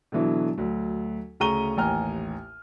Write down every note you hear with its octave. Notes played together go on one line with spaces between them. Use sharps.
B2 D3 E3 F#3
D2 F#3
D2 C#3 A#5 C#6 D#7 G7
A1 D#2 G#5 A#5 F6